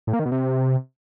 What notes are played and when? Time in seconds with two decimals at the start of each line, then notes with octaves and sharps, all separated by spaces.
0.07 A2
0.13 A#3
0.19 D#3
0.26 B2
0.32 C3